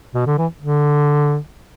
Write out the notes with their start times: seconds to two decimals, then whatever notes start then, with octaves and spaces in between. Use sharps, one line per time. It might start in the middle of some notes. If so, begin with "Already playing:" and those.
0.15 B2
0.27 D3
0.38 E3
0.62 D3